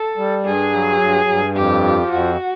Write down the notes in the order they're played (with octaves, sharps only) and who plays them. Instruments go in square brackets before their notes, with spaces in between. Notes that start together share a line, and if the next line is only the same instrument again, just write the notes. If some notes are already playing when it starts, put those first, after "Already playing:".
Already playing: [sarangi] A4
[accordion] G3
[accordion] G2 [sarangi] G#4
[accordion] F#3
G2
G2
[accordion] F2 [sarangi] G4
[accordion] F3
[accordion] F2 [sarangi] F#4